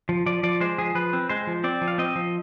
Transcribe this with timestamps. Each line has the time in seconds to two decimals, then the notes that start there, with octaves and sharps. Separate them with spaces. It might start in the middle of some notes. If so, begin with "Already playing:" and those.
0.09 F3
0.26 F3 D5
0.43 F3 D5
0.61 G#3 C5
0.78 F3 G#4
0.95 F3 B4
1.13 C4
1.29 G#3 C5
1.47 F3
1.64 C4 D5
1.81 F3
1.88 F5
1.98 C4 D#5
2.15 F3